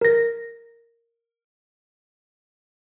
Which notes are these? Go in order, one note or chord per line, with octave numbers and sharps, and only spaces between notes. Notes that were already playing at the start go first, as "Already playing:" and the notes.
A#4 A#6